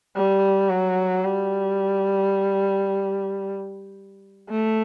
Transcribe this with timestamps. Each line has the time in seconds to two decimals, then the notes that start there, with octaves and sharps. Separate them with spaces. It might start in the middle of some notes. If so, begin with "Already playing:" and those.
0.16 G3
0.70 F#3
1.24 G3
4.50 A3